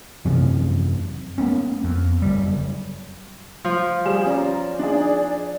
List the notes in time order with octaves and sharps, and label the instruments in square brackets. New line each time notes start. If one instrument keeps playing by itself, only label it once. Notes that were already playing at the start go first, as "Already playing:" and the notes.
[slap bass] F#2 C3 E3 F3
A#3 B3 C#4
F2
F#1 G3
[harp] F3
[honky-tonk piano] G3 G#4 E7
[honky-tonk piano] C#4 A#5 [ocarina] D5
[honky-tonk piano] D4 D#4 G#4